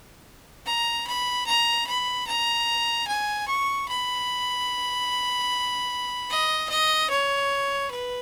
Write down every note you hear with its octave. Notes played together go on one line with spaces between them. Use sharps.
A#5
B5
A#5
B5
A#5
G#5
C#6
B5
D#5
D#5
C#5
B4